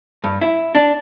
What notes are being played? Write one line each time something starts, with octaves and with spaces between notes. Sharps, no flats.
G2
E4
D4